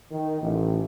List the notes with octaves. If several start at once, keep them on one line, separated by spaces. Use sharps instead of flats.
D#3
A1